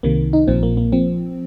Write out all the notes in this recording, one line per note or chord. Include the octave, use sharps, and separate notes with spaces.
C2 C3 D#3 A#3
D#4
A#1 A#2 F3 C4
A#3
A#3
F3 C4